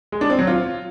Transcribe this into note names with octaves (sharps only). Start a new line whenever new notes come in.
G#3
D4
C4
F#3
F4